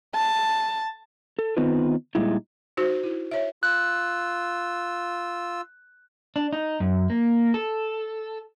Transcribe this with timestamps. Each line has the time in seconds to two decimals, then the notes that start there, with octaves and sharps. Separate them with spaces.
0.15 A5
1.39 A4
1.57 D#3 B3 C4 D#4 F4 B4
2.15 A#2 G3 G#3 D#4 E4
2.77 D#4 F#4 C5
3.04 E4
3.31 C#5 E5
3.63 F4 E6 F#6
6.36 D4
6.53 D#4
6.80 F#2
7.10 A#3
7.54 A4